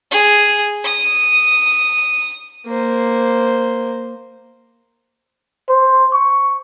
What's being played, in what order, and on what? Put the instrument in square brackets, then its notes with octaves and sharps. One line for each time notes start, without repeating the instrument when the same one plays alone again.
[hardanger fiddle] G#4
D#6
[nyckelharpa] A#3 C5
[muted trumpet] C5
C#6